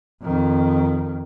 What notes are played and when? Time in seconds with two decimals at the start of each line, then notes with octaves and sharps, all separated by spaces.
0.23 F2 D#3